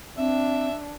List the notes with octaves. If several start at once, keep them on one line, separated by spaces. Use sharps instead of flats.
C4 D4 E5